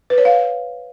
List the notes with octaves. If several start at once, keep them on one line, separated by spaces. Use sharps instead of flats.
B4
C#5
F5